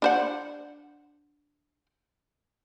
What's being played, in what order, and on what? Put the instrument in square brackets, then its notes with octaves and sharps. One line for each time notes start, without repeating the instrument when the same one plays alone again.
[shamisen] D4 C5 F#5